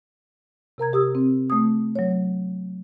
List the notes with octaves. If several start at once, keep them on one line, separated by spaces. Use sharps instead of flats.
C3 A#4 A#5 G#6
G4 D#6 E6
C4
A3 D#6
F#3 C#5